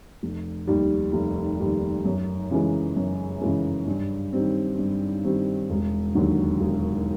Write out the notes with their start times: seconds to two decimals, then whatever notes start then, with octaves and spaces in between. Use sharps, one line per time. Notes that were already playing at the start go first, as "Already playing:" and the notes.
0.23 F1
0.67 D#2 D#3 G3
1.13 F1
1.60 D#2 D#3 G3
2.05 F#2
2.51 C#3 E3 G#3
2.97 F#2
3.42 C#3 E3 G#3
3.87 G2
4.33 D#3 G3 C4
4.79 G2
5.24 D#3 G3 C4
5.70 E1
6.15 D#2 D3 F#3
6.61 E1